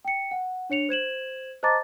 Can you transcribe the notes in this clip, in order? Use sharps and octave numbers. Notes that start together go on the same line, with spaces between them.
G5 C#7
F#5
D4 C#5 C#7 F7
C5 G#6 E7 F#7
C5 D#5 A5 A#5 D6 A6